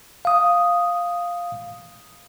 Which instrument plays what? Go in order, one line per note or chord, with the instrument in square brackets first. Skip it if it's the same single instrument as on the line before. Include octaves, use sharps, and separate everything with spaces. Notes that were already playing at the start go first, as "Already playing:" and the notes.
[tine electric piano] F5 D#6